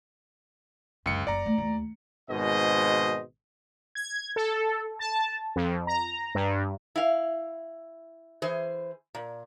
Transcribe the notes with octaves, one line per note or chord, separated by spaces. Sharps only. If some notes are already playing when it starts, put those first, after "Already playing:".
C#2 F#2 D3 C#7
F#1 D5 A#5
A3
D#2
G#1 G#2 B2 G#3 C5 D#5
G#6
A4
A5
F2
A#5
G2
E4 F5
E3 G#4 C5
A#2